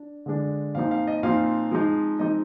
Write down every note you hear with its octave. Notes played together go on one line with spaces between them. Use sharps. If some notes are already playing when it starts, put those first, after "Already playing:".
Already playing: D4
D3 G#3 D4
A#2 F3 C4 D#4 F5
F5
D#5
A#2 F3 C4 D#4 F5
F3 G#3 C4 D#4
F3 G#3 C4 D#4 D#5